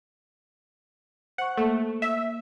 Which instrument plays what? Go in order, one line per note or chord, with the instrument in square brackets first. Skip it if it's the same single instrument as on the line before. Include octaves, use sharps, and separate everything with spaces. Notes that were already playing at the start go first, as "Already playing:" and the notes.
[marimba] C5 C#6 [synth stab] F#5
[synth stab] A3 [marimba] A#3
[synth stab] E5